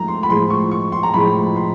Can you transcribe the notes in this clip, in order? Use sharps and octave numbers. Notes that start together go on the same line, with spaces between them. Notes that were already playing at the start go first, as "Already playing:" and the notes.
Already playing: G#2 F3 A3 A#5
C6
B5
A2 F3 G#3 C6
C#6
C#6
C6
A#5
A2 F3 G#3 B5
C6